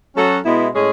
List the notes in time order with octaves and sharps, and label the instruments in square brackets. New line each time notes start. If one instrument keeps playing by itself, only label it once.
[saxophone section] F#3 C#4 F#4 A4
B2 G#3 B3 E4
A2 G#3 C#4 G#4